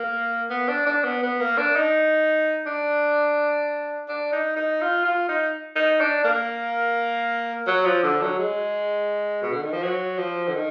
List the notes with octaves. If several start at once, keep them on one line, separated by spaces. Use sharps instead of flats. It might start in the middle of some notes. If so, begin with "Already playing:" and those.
Already playing: A#3
B3
D4
D4
B3
B3
A#3
D4
D#4
D4
D4
D#4
D#4
F4
F4
D#4
D#4
D4
A#3
F#3
F3
D3
F#3
G#3
B2
D3
D#3
F3
F#3
F3
D3
D#3